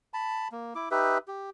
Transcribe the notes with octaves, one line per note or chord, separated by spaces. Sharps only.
A5 B5
A#3
E4 D6
D#4 G4 B4 E5
G4